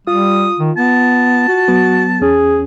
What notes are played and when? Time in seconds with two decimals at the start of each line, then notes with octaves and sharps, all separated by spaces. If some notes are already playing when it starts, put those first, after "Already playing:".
0.07 G3 F4 D#6
0.59 D#3
0.77 B3 A5
1.48 F#4
1.68 F#3 B3
2.21 E2 C#4 G#4